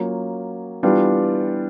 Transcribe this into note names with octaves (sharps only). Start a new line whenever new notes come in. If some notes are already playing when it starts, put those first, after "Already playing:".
Already playing: F#3 A#3 C#4 F4
E3 G3 B3 D4 F4